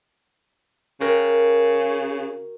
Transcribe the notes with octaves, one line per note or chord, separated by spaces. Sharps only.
C#3 F#4 G4 A#4